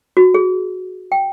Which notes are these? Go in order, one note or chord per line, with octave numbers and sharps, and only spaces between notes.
F#4
G#4
G5